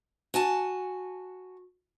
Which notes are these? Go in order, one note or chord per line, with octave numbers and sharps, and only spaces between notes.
F#4 G#5 A5